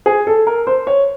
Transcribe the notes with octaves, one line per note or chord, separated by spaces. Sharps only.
G#4
A4
A#4
C5
C#5